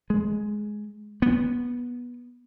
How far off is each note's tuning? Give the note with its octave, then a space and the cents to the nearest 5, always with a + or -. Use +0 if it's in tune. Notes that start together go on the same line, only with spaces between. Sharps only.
G#3 +10
B3 -15